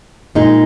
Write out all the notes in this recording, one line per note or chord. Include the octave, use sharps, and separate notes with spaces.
A#2 G#3 D#4